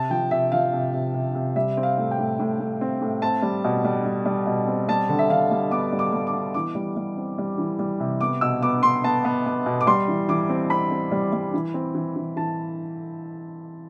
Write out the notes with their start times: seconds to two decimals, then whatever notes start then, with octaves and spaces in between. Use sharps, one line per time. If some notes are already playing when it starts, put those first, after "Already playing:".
Already playing: C3 A5
0.10 F3 G5
0.31 C3 E5
0.52 F3 F5
0.73 C3
0.94 C3
1.14 C3
1.35 C3
1.56 G3 E5
1.77 C4
1.83 F5
1.98 A2
2.11 G5
2.19 A2
2.39 A2
2.60 A2
2.81 C4
3.02 A2
3.22 C4 A5
3.42 G3
3.64 B2
3.85 G3
4.06 G3
4.26 G3
4.46 B2
4.68 C4
4.89 G3 A5
5.09 D3
5.19 E5
5.30 D3 F5
5.51 G3
5.71 B3 D6
5.92 G3
5.99 D6
6.13 G3
6.27 D6
6.34 B3
6.54 E3 D6
6.75 G3
6.96 G3
7.17 C4
7.38 G3
7.58 E3
7.79 G3
8.00 C3
8.21 B3 D6
8.41 B2 E6
8.62 B3 D6
8.83 B3 C6
9.04 B3 A5
9.25 B3
9.46 B3
9.66 B2
9.81 D6
9.87 G3 C6
10.08 E3
10.29 E3 D6
10.50 C4
10.70 C4 B5
10.91 C4
11.12 G3
11.33 G3
11.54 E3
11.74 C4
11.95 E3
12.16 E3
12.37 E3 A5